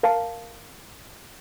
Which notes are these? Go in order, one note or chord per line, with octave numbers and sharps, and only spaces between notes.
A#4 F5 A5